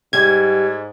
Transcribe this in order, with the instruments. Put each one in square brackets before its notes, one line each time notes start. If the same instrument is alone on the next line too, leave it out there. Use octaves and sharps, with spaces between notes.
[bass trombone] G#2 [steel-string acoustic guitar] G3 [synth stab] G#6